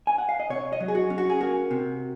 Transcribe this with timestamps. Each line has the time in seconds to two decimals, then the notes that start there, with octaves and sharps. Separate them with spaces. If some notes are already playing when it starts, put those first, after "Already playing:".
0.07 G#5
0.18 F#5
0.29 F5
0.40 D#5
0.50 C3 C#5
0.73 D#5
0.80 F#3
0.88 G#4
0.95 F#4
1.10 C#4
1.18 F#4
1.30 G#4
1.41 A#3 F#4
1.71 C3